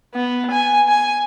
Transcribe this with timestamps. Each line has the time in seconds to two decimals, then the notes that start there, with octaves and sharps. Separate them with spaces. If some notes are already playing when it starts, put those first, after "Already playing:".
0.14 B3
0.51 G#5
0.88 G#5